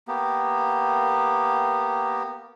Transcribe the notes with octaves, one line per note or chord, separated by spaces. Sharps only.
A#3 B3 G4